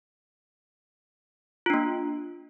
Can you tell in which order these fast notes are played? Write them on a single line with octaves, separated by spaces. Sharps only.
F4 D4 A#3